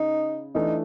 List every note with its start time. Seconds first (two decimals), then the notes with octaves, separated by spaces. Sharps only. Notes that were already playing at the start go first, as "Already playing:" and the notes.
Already playing: C#3 D#4
0.54 E3 A3 D4 D#4